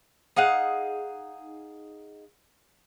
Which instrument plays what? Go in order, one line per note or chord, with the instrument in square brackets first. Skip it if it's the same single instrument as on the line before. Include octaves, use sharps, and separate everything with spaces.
[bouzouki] D#4 G#4 F5 F#5